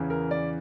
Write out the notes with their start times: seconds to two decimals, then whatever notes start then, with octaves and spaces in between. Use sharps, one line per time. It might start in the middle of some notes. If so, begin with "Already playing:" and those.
Already playing: E2 C#3 E3
0.10 A#4
0.31 D5